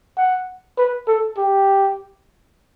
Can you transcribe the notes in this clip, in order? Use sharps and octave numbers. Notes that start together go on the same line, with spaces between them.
F#5
B4
A4
G4